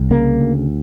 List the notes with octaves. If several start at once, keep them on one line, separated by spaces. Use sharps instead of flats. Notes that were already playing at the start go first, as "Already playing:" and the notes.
Already playing: C2
C#3 A#3
D2